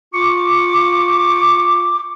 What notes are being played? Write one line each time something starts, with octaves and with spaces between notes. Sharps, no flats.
F4 C#6 D6